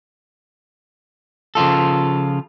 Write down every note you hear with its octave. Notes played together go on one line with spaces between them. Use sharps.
C#3 F3 F4 A4